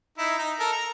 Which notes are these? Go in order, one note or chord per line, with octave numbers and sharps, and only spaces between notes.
D#4 E4
D#4
A4 A#4
A#5